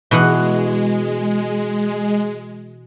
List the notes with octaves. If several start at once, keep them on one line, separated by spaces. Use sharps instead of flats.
B2 E3 G#3 F#5